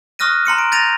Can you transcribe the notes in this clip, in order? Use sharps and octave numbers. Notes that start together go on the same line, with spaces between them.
C#6 D#6 F6 F#6 A#6 D#7
A#5 C6 C#7 D#7
D7
G6 A6 A#6 D#7 F7